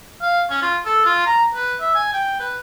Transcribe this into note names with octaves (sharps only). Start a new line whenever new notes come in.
F5
C#4
F4
A4
F4
A#5
B4
E5
G#5
G5
B4